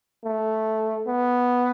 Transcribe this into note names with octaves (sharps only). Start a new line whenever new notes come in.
A3
B3